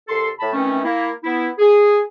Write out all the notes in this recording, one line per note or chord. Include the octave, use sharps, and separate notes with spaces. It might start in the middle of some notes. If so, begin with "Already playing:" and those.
C2 A4 C6
A2 A5 B5
D#3 E3 A3 C4 C#4
A#3 E4
B3 E4
G#4